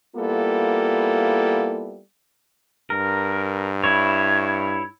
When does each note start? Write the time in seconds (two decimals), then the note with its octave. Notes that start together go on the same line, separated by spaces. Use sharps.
0.16 G3 A#3 B3 E4 F4 A4
2.90 G2 A#4
3.84 E4 C#5